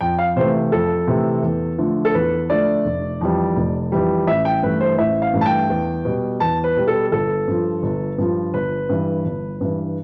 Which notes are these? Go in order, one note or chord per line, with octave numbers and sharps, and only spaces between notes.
F2 G5
F5
C3 E3 A3 C5
F2 A4
C3 E3 A3
E2
D3 F3 A3
A4
E2 B4
D3 F3 A3 D5
F1
F2 E3 G3
F1
F2 E3 G3
A1 E5
G5
G2 E3 A3 B4
C5
A1 E5
F5
G2 E3 A3
A5
G5
E2
B2 G3
E2 A5
B4
B2 G3
A4
G1 A4
G2 F3
G1
G2 F3
G1 B4
G2 E3
G1
G2 E3